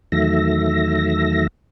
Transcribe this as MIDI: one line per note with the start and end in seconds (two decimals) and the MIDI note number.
0.12 1.47 40
0.12 1.47 51
0.12 1.47 54
0.12 1.47 57
0.12 1.47 76
0.12 1.47 94